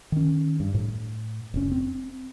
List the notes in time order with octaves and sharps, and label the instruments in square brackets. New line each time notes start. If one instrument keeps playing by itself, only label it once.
[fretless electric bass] D#3 C#4
G2
A2
F1 C#4
C4